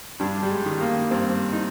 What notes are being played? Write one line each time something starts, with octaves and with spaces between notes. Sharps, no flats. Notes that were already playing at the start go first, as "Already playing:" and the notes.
G2 D4
G3
G#3
D#3
A#3
G2 C4
D#4